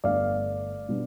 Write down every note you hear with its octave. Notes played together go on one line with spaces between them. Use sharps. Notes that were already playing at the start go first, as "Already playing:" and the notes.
G1 G2 D3 A3 D5 F5
B2 G3 B3 D4